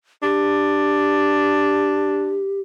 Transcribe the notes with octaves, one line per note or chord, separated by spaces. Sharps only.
D4 G4